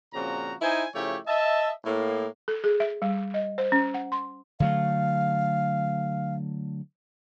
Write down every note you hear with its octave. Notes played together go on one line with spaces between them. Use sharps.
A#2 C#3 F3 C4 F#4 A#5
D#4 E4 C5 G#5
C#3 F3 A3 E4 G4 C#5
D#5 E5 A5
A2 A#3
A4
G#4
E5
G3
D#5
C5
C#4
F#5
C6
D3 F#3 A3 F5